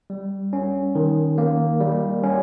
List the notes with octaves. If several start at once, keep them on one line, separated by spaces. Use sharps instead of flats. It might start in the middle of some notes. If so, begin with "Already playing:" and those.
G3
C#4
D#3
A#3
G3
C#4